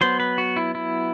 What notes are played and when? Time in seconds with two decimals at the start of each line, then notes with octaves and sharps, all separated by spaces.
0.01 F#3 B3 C5
0.20 B4
0.38 F#4
0.56 E4
0.75 E4